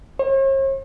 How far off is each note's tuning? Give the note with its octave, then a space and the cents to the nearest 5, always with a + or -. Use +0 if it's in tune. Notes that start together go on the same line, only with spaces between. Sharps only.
C#5 -45